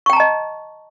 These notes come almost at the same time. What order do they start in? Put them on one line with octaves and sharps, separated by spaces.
C#6 G5 A#5 A5 D#5